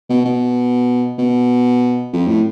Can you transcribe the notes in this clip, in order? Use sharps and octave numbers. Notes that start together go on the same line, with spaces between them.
B2
B2
B2
F2
A2